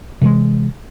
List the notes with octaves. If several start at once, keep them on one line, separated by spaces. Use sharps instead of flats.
C3 E3 F#3 G#3